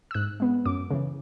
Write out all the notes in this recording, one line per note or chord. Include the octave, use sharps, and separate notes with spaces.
E6
G#2 F#6
G#3 B3
F#2 D6
C#3 E3